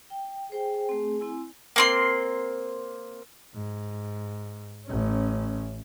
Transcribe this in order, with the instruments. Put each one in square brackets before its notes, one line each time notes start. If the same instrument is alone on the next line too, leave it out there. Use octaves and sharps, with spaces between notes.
[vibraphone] G5
[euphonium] G#4 [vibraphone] C5 G5
[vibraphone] A3 C4
C4 E4 G#5
[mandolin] A#3 C4 C6
[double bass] G#2
A1 C#4